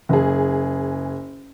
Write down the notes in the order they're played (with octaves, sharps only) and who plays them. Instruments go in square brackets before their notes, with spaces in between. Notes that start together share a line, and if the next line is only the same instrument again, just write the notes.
[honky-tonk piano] F#1 G#4